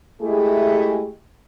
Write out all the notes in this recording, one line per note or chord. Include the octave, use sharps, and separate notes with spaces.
G#3 A3 E4 G4 G#4